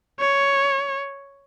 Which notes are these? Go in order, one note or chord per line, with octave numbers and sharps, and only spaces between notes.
C#5